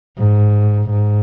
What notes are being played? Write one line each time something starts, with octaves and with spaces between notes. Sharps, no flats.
G#2
G#2